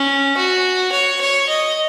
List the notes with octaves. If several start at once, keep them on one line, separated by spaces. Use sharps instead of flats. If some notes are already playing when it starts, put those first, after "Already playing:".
Already playing: C#4
F#4
C#5
C#5
D#5